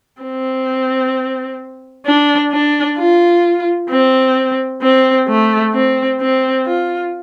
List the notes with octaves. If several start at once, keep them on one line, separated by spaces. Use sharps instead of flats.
C4
D4
D4
F4
C4
C4
A3
C4
C4
F4